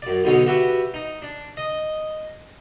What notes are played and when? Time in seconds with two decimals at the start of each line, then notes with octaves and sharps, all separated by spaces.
0.02 F#2 D5
0.24 B1 B2 D3 D#4 C#5
0.47 F#4 G4 B4 E5
0.94 D#4
1.22 D4
1.57 D#5